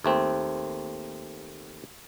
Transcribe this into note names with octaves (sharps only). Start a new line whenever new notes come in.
D#2 A3 C4